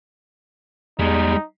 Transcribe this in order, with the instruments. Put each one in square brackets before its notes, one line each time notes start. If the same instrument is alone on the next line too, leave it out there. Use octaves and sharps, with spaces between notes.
[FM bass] E2 [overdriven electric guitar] G3 G#3 [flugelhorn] D#4